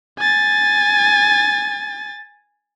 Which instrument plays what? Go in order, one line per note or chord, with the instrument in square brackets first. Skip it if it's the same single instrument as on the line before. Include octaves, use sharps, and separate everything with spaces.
[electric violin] G#5 A6